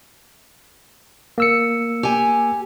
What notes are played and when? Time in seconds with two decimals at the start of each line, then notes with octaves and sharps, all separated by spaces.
1.38 A#3 E6 C#7
2.03 G4 G#5